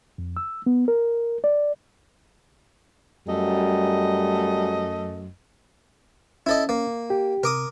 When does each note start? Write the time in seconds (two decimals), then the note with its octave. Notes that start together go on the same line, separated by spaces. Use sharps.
0.18 F2
0.37 E6
0.66 B3
0.88 A#4
1.44 D5
3.27 F#2 G3 A3 D#5
6.46 C#4 E4 A4 D#5
6.69 A#3
7.10 G4
7.43 C3 A#4 D6 D#6